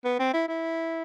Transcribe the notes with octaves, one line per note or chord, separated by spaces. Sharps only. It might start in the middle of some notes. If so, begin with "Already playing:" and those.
B3
C4
E4
E4